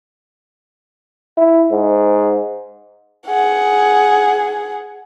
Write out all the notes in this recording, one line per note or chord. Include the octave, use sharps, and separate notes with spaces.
E4
G#2
G#4 F#5